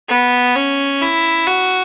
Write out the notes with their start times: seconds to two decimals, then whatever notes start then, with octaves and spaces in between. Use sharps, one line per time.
0.09 B3
0.56 C#4
1.02 E4
1.47 F#4